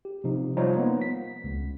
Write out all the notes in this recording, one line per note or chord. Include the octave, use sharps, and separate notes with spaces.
G4
C3 F3 D#4
F3 G3 D#4 F4 C5 C#5
A#3 B3
B6
C#2